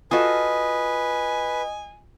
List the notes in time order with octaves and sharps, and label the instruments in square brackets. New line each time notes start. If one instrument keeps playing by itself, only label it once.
[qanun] F4 F#4 A4 [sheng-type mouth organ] B4 [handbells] D#5 D#6 [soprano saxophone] G#5